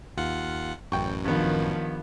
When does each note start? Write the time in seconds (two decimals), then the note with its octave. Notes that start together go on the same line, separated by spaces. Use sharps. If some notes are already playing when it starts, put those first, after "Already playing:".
0.17 D#2 F4 F#5
0.92 A1 F#2 G5 C#6
1.25 G2 D#3 F3 B3